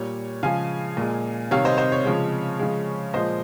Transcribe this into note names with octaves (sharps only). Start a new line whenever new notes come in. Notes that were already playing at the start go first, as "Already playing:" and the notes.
Already playing: A#2 G3 C#5
C#3 F3 G#3 F5 G#5
A#2 G#3
C3 D#3 G3 C#5 F5
C5 D#5
C5 D#5
C#5
C#3 F3 G#3
C#3 F3 G#3
A#2 F3 G#3 C5 D#5